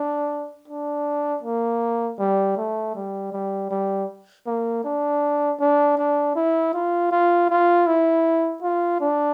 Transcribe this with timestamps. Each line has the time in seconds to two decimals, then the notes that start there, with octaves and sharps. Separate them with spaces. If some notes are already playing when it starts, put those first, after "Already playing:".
Already playing: D4
0.68 D4
1.43 A#3
2.19 G3
2.57 A3
2.95 G3
3.33 G3
3.70 G3
4.46 A#3
4.84 D4
5.60 D4
5.98 D4
6.36 E4
6.74 F4
7.11 F4
7.49 F4
7.87 E4
8.62 F4
9.00 D4